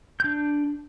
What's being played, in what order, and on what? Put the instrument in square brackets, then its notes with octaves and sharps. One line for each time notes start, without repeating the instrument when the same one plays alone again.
[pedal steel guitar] D4 G6